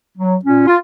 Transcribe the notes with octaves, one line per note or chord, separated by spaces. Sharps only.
F#3
A#2 C#4
F4